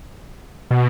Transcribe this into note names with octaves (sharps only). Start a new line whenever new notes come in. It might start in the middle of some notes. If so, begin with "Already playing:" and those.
B2